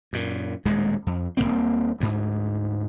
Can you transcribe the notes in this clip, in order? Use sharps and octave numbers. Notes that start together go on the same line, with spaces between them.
F#2 A#2
D#1 D#2 A2 G#3
F2
D#1 A2 A#3 C4
D2 G#2